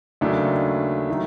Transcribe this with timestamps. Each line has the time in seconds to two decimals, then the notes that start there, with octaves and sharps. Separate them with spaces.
0.21 D#2 C#3 F#3 A3 D4
1.09 D#3 F#3 A3